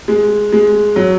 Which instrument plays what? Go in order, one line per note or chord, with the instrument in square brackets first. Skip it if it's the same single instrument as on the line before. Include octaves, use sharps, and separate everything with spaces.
[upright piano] G#3
G#3
F#3